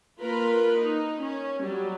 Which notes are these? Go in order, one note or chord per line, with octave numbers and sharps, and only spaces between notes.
A#3 F4 A#4 B4 B5
D#4
C#4
F#3 G3